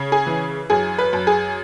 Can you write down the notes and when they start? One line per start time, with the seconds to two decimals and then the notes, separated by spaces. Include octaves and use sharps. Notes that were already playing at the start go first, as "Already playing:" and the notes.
Already playing: C#3
0.12 G#4
0.27 E3
0.70 F#2 G#4
0.98 B4
1.13 F#2
1.27 G#4